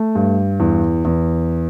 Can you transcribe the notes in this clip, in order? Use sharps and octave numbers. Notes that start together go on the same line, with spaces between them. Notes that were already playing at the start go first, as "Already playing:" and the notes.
Already playing: A3
G2
E2
E2